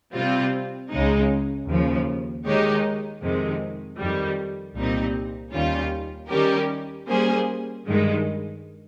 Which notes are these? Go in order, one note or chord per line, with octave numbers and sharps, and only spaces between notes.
C3 G3 C4 F4
C#2 C#3 G#3 D#4
D#2 C#3 F3
D#3 G#3 D#4 G4 C#5
F2 C3 D#3 G#3
F2 D#3 G3
C2 A#2 G3 C4 D#4
D#2 D#3 G3 C#4 F4
D#3 G3 C#4 G4 A#4
G3 A#3 C#4 G#4 C5
G2 D#3 G#3